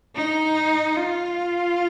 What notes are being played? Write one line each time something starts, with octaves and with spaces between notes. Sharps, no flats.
D#4
F4